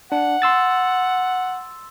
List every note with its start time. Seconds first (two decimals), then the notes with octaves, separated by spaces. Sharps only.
0.12 D4 F#5
0.42 C6 E6 A6